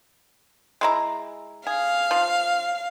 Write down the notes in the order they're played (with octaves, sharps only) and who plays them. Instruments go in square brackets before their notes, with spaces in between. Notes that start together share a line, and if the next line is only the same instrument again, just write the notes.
[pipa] G#3 E4 A#5
[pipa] G#4 [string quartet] F5
[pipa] F3